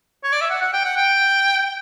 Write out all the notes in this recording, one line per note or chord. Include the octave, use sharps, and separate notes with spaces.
C#5
D5
E5
F#5
F#5
G5
F#5
G5